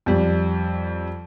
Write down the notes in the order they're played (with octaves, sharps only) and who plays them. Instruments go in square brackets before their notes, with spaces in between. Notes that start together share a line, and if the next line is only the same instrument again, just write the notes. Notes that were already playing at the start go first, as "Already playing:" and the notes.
[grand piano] F2 G3